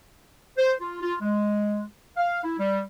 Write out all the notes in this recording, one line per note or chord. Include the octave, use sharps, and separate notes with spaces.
C5
F4
F4
G#3
F5
E4
G3